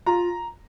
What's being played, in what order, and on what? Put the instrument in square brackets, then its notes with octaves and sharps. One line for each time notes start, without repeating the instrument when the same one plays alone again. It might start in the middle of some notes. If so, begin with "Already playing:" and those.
[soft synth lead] F4 [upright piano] A#5